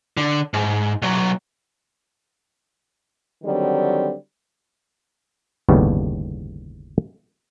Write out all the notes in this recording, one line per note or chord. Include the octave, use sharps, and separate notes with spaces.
D3
G#2
B1 F#3
D3 D#3 F#3 G3 C4
G1 D#2 A2 C#3 G3 B3